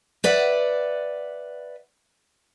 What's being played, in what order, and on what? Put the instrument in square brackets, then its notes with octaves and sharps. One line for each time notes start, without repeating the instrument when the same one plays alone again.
[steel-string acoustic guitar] B4 D5 E5 F#5